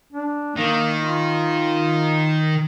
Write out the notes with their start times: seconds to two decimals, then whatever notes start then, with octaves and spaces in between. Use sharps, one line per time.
0.12 D4
0.56 D#3 A#3
1.01 F4